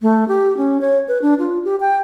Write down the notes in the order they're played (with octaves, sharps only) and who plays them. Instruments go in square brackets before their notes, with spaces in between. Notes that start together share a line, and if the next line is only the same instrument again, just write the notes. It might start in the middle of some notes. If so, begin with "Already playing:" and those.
[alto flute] A3
G4
C#4
C#5
B4
D4
F4
G4
G5